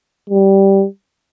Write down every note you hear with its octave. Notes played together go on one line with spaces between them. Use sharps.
G3